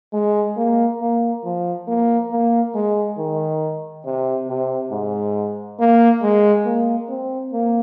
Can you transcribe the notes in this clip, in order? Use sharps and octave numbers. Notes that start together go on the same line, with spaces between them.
G#3
A#3
A#3
F3
A#3
A#3
G#3
D#3
C3
C3
G#2
A#3
G#3
A#3
C4
A#3